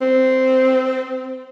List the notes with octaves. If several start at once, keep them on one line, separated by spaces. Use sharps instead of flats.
C4